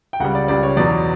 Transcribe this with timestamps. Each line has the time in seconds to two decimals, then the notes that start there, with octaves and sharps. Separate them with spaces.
0.13 G5
0.20 C#2 C#3 G3 F#5
0.35 D5
0.48 C#2 C#3 G3 D5
0.63 C#5
0.76 E2 B2 F#3 D5